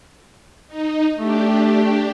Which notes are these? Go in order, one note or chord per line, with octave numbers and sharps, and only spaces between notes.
D#4
A3 D4 G4